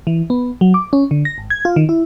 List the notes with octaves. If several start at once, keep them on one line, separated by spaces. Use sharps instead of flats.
E3
B3
F#3
D6
C#4
D3
A#6
G#1
G#6
F4
D#3
E4